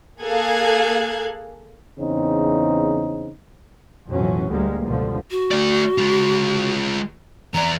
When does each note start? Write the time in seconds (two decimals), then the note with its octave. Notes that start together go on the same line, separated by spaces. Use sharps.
0.22 A#3 G#4 A4 F5 F#6 G#6
1.99 E2 C#3 C4 D#4
4.09 B1 F2 A2 E3 F#3 C#4
4.50 D2 A2 D3 G3 G#3 A#3
4.85 C#2 G2 B2 D3 F3
5.31 F#4
5.51 A3 D5
5.98 G#3 F4
7.54 E2 D5 A#5